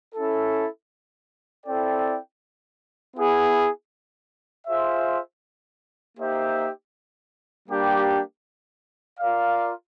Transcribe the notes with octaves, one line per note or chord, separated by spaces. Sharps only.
C#4 E4 A4
C4 E4 A4 D5 G5
B3 E4 G#4
F4 G#4 C5 E5
A#3 D#4 G4 C5 E5
G3 A#3 D4 G4
F4 A#4 D5 F5